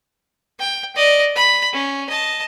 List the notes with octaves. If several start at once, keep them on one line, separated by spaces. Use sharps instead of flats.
G5
D5 D#5
B5
C#4
D#5 A5